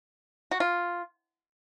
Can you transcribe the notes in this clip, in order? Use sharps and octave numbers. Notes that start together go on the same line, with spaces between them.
F#4
F4